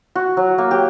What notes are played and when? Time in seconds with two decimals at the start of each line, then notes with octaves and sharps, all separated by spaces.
0.15 F#4
0.37 F#3
0.58 A#3
0.71 G4